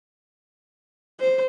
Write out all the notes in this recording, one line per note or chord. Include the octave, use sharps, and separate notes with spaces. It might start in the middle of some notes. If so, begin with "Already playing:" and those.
C5